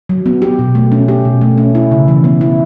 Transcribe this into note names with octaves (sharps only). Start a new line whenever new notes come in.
F#3
B3
G4
B2
A3
C#4
G4
B2
A3
C#4
E4
C#3
E3
B3
E4